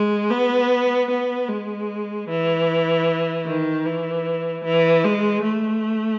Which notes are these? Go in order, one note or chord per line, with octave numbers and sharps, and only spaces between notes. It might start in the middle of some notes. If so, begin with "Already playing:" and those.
Already playing: G#3
B3
B3
G#3
E3
D#3
E3
E3
G#3
A3